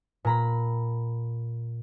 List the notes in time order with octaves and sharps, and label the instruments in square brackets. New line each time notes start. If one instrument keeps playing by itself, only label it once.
[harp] A#2 A#5 B5